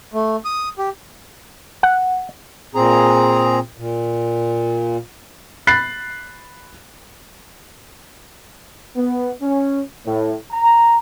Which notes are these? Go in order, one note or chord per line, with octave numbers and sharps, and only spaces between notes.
A3
D#6
G4
F#5
A#2 C4 G#4 A#5
A#2
B5 F#6 A6 C7
B3
C#4
A2
A#5